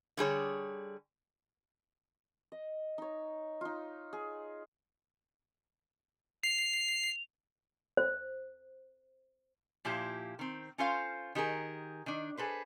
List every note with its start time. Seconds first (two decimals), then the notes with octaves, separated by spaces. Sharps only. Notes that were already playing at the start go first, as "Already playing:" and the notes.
0.17 D3 G3 G#4 C#5
2.52 D#5
2.98 D#4 C#5
3.61 D#4 F4
4.13 G#4
6.43 C7 F7
7.97 C5
9.85 A#2 F3 E4 G4
10.39 D#3 C4
10.78 C#4 F4 A4 C5 F5
11.35 D#3 G4 G#4 A#4
12.06 D#3 D4
12.37 G#4 A4 B4 C5